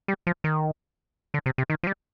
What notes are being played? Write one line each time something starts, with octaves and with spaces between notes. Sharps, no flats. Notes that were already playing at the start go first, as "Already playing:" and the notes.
G3
F3
D#3
D3
C3
C3
D#3
F3
G3